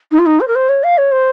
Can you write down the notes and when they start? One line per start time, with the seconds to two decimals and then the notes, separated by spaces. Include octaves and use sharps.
0.12 D#4
0.19 F4
0.26 D#4
0.40 C5
0.48 A#4
0.55 C5
0.69 C#5
0.83 F5
0.98 C#5
1.12 C5